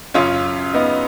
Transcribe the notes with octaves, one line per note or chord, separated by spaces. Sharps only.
F#2 C#3 C#4 F4
B3 D#4